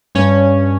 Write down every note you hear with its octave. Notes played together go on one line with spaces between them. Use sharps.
G2 C#4 C#5